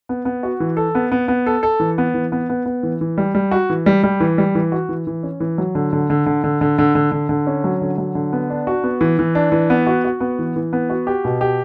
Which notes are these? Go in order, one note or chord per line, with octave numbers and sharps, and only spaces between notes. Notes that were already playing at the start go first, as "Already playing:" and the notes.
B3
B3
F#4
E3
A4
B3
B3
B3
A4
A4
E3
B3
E3
B3
B3
B3
E3
E3
G3
G3
F#4
E3
G3
G3
E3
G3
E3
F#4
E3
E3
C#4
E3
F#3
D3
D3
D3
D3
D3
D3
D3
D3
D3
D3
C#4
F#3
D3
F#3
D3
B3
D4
F#4
B3
E3
E3
D4
E3
B3
F#4
F#4
B3
E3
E3
B3
F#4
G4
B2
G4